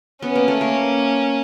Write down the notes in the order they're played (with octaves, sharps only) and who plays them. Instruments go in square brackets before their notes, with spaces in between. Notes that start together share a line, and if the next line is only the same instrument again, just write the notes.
[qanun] B3 [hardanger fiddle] C#4
[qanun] A#3
A3
A#3